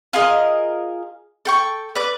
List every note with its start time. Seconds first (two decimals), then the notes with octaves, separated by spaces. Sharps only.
0.13 F4 G#4 A#4 D#5
1.45 A4 G5 C#6
1.95 B4 D5